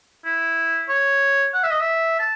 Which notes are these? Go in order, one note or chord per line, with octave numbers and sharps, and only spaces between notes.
E4
C#5
F#5
E5
D#5
E5
A5